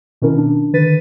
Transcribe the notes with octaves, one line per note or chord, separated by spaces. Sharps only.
B2 D#3 C#4 E4 A#4
D4
D3 D#3 B4 A6 B6 D#7